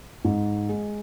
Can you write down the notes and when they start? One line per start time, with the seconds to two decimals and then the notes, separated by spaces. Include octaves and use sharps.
0.25 G#2
0.69 G#3